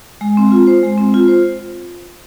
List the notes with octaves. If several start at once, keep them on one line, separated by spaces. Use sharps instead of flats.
G#3
C4
F4
C5
G#3
C4
F4
C5